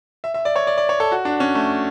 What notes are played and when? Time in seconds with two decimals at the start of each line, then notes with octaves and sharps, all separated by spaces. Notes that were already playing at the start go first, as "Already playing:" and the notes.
0.24 E5
0.34 E5
0.45 D5
0.56 C#5
0.67 D5
0.78 D5
0.89 C#5
1.00 A4
1.12 F#4
1.25 D4
1.40 C#4
1.55 A3